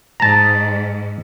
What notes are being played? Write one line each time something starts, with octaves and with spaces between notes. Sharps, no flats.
G#2 A5 A#5